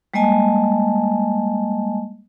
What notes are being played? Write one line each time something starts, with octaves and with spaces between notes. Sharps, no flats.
G3 G#3 A#3 D#5 G#5 A5